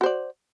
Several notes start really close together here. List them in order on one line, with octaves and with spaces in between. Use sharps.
F#4 C5 D5